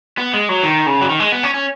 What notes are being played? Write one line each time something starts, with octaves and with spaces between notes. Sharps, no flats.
B3
G#3
F#3
D#3
C#3
F#3
D#3
G#3
B3
C#4
C#4